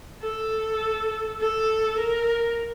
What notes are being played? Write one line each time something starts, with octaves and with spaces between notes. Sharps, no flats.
A4
A4
A#4